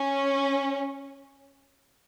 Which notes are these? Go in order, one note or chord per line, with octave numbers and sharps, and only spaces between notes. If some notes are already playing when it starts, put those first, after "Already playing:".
Already playing: C#4